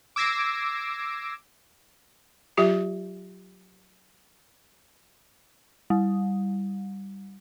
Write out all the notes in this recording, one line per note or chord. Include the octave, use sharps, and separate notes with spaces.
D6 E6 G#6 A#6 C7 D7
F#3 F4 G4 E5
G3